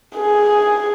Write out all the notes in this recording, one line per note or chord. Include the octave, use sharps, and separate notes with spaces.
G#4